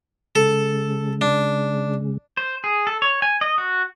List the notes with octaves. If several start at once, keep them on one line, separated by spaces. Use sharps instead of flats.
C#3 G#3 A4
D4
C5
G#4
A4
C#5
G#5
D#5
F#4